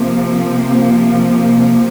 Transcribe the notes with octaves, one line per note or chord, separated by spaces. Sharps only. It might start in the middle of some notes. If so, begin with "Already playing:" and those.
Already playing: C3 F3 A#3